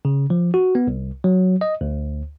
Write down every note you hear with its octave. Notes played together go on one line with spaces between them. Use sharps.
C#3
F3
F#4
B3
C2
F#3
D#5
D2